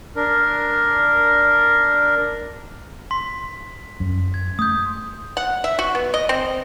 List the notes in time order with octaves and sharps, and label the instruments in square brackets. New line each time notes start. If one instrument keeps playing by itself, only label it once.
[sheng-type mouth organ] D4 A#4
[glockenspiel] C6 B6
[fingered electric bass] F#2
[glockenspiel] G#6
[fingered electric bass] A3 [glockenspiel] D#6 G6
[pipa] F#5
E5
F#4
B3
D#5
C4